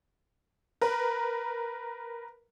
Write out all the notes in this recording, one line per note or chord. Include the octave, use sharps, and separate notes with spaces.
A#4 B4